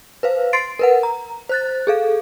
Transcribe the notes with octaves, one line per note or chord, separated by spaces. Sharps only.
B4 C5 F5
C6 A6 C7 D7
A#4 B4 F#5
A#5
C5 F#6 A6
G#4 A4 F5